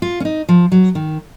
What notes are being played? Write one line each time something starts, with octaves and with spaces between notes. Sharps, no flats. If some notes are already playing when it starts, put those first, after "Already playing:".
F4
C#4
D#4
F3
F#3
D#3